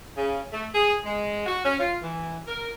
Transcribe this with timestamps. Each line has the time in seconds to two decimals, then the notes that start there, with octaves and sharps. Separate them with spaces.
0.16 C#3
0.52 A3
0.74 G#4
1.05 G#3
1.46 F#4
1.64 C#4
1.80 F4
2.02 E3
2.47 A#4